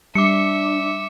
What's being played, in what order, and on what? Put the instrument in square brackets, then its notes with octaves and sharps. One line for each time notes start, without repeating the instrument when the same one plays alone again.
[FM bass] G3 [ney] D4 [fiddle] E5 [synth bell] D6 C#7